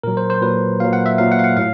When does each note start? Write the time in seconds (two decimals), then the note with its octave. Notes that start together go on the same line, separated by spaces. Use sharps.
0.03 A#2 F#3 A#4
0.17 C5
0.30 C5
0.42 A#2 F#3 B4
0.80 A#2 F#3 F5
0.93 F#5
1.06 E5
1.18 A#2 F#3 F5
1.32 F#5
1.39 F5
1.44 F#5
1.57 A2 F5